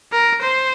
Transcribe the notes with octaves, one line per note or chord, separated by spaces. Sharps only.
A#4
C5